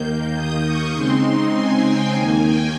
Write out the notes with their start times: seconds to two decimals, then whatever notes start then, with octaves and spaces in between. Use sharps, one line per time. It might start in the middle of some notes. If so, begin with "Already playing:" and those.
Already playing: D#2 D#3 A#3 G6
0.35 D#6
0.65 C#6
0.94 C#3 G#3 C4 D#4 C6
1.23 C6
1.53 G#5
1.83 G5
2.12 D#2 D#3 A#3 G#5
2.42 G5